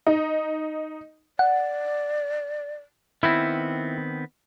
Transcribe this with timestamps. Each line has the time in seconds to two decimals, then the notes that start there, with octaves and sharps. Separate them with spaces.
0.07 D#4
1.39 D5 F#5
3.23 D#3 B3 C4 E4